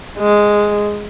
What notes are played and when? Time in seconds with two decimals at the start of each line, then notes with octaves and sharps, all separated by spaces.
0.18 G#3